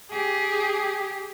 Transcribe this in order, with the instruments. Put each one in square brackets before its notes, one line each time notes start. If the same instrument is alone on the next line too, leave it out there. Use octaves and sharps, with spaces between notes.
[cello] G4 [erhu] G#4